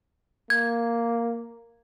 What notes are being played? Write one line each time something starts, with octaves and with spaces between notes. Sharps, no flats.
A#3 G#6